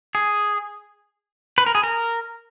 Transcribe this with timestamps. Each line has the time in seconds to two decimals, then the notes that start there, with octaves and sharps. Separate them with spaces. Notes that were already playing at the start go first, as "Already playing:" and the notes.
0.15 G#4
1.58 B4
1.67 A#4
1.75 G#4
1.84 A#4